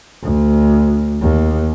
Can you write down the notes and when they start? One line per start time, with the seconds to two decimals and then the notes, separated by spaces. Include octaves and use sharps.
0.23 D2
1.22 D#2